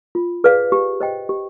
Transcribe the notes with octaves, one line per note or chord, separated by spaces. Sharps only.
F4
G#4 B4 D5 F5
G4
C5 D#5 G5
G4